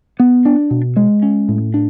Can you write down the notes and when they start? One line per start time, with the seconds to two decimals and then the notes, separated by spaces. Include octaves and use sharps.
0.20 B3
0.45 D4
0.71 B2
0.97 G#3
1.23 C#4
1.49 A2
1.74 D4